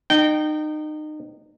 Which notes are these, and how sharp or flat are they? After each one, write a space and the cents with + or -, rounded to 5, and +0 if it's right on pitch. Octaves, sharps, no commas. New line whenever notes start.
D#4 -30 G5 -20